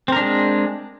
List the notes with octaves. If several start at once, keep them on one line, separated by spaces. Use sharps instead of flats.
G#3 C4 D4 A#4